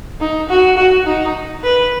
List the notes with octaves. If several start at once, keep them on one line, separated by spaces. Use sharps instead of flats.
D#4
F#4
F#4
D#4
B4